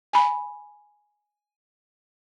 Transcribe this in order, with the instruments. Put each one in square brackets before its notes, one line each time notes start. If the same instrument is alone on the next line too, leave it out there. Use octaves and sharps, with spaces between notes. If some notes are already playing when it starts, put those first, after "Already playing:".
[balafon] G#5 B5